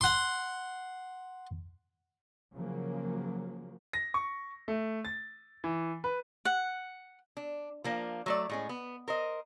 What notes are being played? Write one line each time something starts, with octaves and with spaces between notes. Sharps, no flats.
F#5 C6
C#3 F3 F#3 A#3
A#6
C#6
A3
A6
E3
B4
F#5
D4
F3 A#3 D4
F#3 A3 D5
A2 G#3 C#4
B3
A#4 C5 D#5